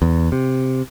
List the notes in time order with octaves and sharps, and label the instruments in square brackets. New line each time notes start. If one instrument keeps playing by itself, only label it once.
[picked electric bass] E2
C3